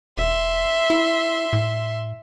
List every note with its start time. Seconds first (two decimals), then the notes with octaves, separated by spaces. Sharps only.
0.17 E1 E5 C6
0.90 E4
1.53 A2